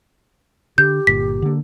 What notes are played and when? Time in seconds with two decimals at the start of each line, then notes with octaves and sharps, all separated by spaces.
0.78 D3 G4 G6
1.07 G1 A#2 B6
1.42 D3 A#3